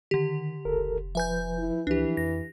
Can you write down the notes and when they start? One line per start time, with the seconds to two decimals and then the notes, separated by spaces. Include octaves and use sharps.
0.11 D3 D#3 G4
0.65 F1 C#2 A4 A#4
1.15 F3 B4 E5 G#5 G6
1.58 E4
1.87 C#2 E3 D4 G4
2.17 F2 A#6